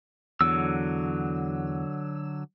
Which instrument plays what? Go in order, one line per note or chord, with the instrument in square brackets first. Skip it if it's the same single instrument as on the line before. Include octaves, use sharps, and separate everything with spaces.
[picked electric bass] E2 [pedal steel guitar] D3 F#3 E6